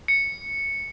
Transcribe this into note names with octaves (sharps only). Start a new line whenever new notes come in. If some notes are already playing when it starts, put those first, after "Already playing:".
C#7